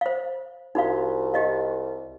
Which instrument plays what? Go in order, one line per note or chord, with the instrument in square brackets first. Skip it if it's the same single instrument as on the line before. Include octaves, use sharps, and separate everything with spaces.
[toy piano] C5 F5
[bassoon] C2 [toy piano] D#4 F#4 F5
[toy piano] G4 D#5 F5